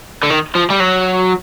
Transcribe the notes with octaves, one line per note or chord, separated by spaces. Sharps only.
D3
D#3
F3
G3
F#3